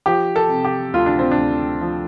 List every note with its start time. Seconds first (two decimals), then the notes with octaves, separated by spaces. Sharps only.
0.06 F3 G4
0.36 A4
0.50 C3
0.65 G4
0.94 D2 F4
1.06 D4
1.19 C4
1.31 D4
1.37 D2
1.81 F3